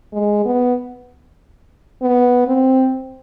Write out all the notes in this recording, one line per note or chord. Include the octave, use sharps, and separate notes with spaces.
G#3
B3
B3
C4